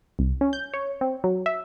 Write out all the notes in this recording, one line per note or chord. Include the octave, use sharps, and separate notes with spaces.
C2
C#4
G6
C#5
C4
F#3
E5